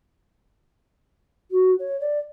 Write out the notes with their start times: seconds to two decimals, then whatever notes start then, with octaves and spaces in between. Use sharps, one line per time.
1.51 F#4
1.79 C#5
2.00 D5